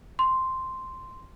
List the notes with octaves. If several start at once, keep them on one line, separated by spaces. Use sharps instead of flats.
C6